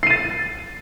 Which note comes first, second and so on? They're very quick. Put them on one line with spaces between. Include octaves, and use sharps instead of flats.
C7 D#7 A6